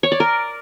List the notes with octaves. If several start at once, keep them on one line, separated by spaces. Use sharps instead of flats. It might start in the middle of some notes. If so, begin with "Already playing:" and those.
C#5
D5
A#4